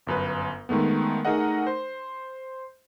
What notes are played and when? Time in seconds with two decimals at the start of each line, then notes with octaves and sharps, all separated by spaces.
0.07 G1 F#2 B4
0.69 D#3 G#3 A3 B3
1.25 A3 D#4 G#4 A#4 D#5 F#5
1.67 C5